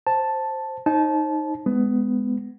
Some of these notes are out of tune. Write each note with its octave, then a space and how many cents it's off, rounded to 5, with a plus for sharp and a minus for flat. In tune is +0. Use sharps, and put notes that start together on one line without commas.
C5 +10 A5 +0
D#4 +0 C5 +40 A5 -25
G#3 +0 B3 +20